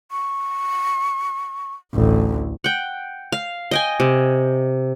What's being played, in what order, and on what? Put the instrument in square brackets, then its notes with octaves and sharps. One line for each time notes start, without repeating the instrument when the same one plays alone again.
[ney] C#6
[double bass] A1 D2
[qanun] F#5 G5
F5
D#5 G5 G#5
C3